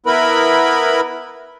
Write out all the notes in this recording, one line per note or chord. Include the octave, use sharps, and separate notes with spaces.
B3 E4 A#4 B4 B5